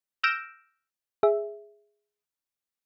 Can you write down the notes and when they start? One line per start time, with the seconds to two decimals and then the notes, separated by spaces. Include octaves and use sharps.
0.23 E6 F6 G6 A#6 D7 E7
1.23 G#4 E5